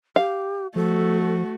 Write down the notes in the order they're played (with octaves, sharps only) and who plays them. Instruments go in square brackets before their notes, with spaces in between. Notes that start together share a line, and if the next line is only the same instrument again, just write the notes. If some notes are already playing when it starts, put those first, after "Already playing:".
[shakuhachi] G4 [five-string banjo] F5
[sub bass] F3 [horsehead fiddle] A3 F#4 [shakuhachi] A4